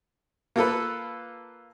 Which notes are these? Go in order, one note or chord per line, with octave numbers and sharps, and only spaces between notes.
A#3 F4 A4 B4